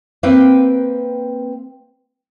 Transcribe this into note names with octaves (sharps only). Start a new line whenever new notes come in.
A#3 C4 B4 F5 G5